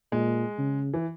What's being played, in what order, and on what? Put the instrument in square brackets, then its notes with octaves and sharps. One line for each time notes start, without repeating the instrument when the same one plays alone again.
[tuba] A#2 [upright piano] G#3
[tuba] C#3
[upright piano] E3